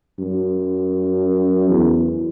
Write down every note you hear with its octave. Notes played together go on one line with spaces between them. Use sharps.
F#2
E2